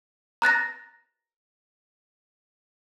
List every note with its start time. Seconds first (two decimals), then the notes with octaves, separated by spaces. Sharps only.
0.42 A#5 F#6 A6 A#6